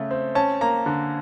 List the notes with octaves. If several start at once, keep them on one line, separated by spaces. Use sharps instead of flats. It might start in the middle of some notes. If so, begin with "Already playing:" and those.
Already playing: C#3 A3
C4
C#4 A5
A#3 A#5
D3